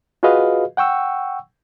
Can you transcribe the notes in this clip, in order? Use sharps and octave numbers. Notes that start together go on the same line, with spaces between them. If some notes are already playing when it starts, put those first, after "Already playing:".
F4 F#4 G#4 B4 D#5 F5
F#5 G5 C#6 E6